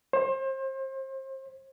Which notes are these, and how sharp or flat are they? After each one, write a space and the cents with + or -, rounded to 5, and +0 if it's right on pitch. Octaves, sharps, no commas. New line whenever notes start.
C5 +30